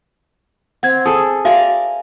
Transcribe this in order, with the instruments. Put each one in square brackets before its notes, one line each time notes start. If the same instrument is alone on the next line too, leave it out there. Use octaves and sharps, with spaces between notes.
[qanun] C4 [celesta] F#5 G#6
[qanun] G#4 A4 [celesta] D#6
[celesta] F#4 E5 F5 [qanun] A#4 D5 G#5